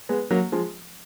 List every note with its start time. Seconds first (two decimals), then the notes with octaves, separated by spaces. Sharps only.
0.09 G#3 B3
0.31 F#3 A#3
0.52 F3 G#3